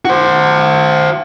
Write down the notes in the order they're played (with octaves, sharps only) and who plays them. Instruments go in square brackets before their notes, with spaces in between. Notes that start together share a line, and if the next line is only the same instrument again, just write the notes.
[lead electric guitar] F#4 C5